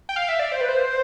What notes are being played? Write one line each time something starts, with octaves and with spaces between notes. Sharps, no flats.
G5
F5
E5
D5
C5
B4
C5